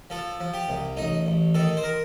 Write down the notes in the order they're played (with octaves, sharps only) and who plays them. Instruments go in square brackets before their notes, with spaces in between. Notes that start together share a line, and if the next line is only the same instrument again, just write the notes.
[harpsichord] F3 A4
F3
G4
C2
A1 D#4
A1
D#3 A4
C5
A#4